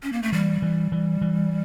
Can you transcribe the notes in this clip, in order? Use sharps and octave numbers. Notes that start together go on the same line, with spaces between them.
C#4
A#3
A3
E3 G3
E3
E3
E3